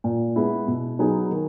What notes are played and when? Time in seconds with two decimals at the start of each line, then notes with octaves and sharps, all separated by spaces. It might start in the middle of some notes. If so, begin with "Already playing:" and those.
0.04 A#2
0.36 G#3 B3 E4
0.68 B2
0.99 F#3 B3 D#4 G#4
1.31 D#3